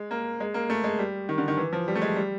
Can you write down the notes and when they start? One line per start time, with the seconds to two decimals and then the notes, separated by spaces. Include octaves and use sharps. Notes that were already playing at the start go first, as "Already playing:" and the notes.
Already playing: G#3
0.11 A#3
0.40 G#3
0.54 A#3
0.70 A3
0.84 G#3
0.99 G3
1.29 D#3
1.38 D3
1.48 D#3
1.57 E3
1.73 F3
1.88 G3
1.95 A3
2.02 G#3
2.16 G3